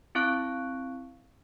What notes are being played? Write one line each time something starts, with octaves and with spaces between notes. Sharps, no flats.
C4 E4 F5 C#6 F#6 D7